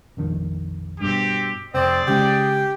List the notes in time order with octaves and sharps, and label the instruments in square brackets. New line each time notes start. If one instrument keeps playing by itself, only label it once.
[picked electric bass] A#1 F2 D#3
[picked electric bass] G2 B2 [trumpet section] C4 G4
[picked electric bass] F1 [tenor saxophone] C4 [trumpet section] G#4 D5
[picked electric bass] C#3 G#3 C#4 [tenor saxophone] G4